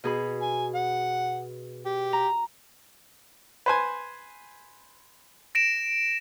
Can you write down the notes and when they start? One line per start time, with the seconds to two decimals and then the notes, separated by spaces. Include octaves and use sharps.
0.04 B2 G#4 B5
0.42 G#5
0.75 F#5
1.86 G4
2.13 A#5
3.66 B4 C5 G#5
5.55 A#6 D7 E7